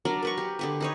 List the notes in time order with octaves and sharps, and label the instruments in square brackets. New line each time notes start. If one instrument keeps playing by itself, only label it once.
[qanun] F#3 D4 A#4 D5
A#4 B4 C#6
G4
D3 G4 B4
D#4 B4 C#5